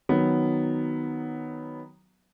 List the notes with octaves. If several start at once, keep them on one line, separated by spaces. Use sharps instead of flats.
D#3 F#3 B3